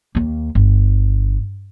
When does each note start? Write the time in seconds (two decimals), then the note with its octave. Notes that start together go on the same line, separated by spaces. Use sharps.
0.15 D#2 A#3
0.55 G1